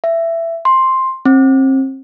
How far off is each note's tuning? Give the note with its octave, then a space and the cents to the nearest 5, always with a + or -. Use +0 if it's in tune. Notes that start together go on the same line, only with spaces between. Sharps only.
E5 +15
C6 +5
C4 +35